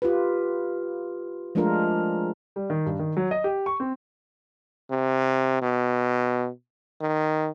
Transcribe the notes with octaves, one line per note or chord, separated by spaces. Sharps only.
F4 G4 B4
F3 G#3 A3 D4 F4 A#4
G3
D#3
G2
D#3
F#3
D#5
G4
C#6
C4
C3
B2
D#3